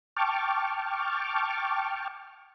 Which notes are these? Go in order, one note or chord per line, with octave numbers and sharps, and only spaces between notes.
G5 A5 C#6 D6 F6